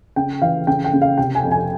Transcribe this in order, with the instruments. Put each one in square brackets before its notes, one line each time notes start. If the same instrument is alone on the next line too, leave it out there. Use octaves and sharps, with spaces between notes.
[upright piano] C#3 G5
E3 F5
C#3 G5
G5
C#3
F5
C3 G5
G#5
F2
G#5